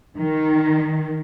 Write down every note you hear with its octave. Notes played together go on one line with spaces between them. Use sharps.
D#3